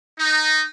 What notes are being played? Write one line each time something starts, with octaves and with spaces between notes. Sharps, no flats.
D#4